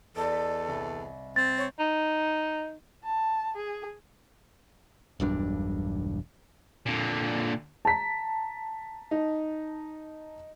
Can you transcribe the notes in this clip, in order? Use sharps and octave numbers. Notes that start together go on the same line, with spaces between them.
E2 A4 D5 D#5
B6
C2
C4 A6
C#5 G6
D#4
A5
G#4
E1 B1 G2 D4
A#2 D3
A5 A#5 B6
D#4